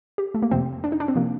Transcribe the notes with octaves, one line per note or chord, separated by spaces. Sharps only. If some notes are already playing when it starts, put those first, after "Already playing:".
G4
A3
A#3
F2 C3 F3 C4
D4
D#4
D4
C4
C3 F3 A#3